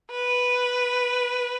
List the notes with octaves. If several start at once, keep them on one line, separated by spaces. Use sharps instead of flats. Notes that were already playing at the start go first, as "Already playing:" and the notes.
B4